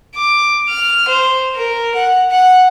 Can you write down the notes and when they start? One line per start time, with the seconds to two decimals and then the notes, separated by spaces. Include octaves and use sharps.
0.16 D6
0.69 F6
1.09 C5
1.55 A#4
1.95 F#5
2.31 F#5